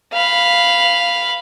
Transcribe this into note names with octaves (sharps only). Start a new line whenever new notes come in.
F5 B5